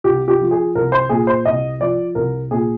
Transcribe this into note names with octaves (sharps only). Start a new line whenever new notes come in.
C2 G4
G4
F3
G#4
C2 A#4
C5
A#2 G#4
C5
C2 D#5
F3 D5
C2 A#4
A#2 G#4